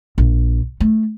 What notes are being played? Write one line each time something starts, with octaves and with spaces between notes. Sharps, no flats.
A#1
A3